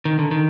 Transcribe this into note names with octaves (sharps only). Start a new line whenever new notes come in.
D#3
D3
D#3